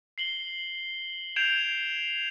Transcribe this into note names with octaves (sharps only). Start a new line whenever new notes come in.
C7 F#7 G7
G6 G#6 C7 D7 E7 F7